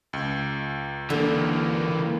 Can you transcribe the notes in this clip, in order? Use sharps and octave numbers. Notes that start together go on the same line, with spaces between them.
C#2
D3 E3 A#3